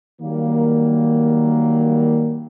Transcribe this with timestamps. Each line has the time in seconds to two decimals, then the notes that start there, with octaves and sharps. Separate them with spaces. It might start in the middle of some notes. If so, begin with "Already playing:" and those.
0.21 D#3 F#3 G3 A#3